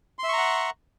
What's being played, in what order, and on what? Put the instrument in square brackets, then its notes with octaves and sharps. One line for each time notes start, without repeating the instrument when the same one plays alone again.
[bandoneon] C6
E5
C#6
A#5
F#5